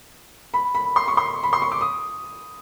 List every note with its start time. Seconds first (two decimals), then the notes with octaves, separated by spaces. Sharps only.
0.54 B5
0.75 B5
0.96 C6
1.08 C#6
1.17 C6
1.43 B5
1.53 C6
1.62 C#6
1.72 D6
1.81 D#6